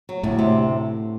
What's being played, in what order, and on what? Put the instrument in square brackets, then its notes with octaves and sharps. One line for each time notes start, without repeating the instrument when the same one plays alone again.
[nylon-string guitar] F#3
[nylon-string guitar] D2 [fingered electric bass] A2
[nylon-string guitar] C3